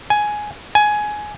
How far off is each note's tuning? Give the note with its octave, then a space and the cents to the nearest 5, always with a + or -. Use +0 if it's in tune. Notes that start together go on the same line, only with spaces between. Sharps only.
G#5 +10
G#5 +15